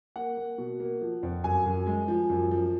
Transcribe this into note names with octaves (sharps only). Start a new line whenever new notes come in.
A#3 F#5
A#3
B2
A#3
F3
F2
F#2 G#5
F#2
G#3
F3
F#2
F3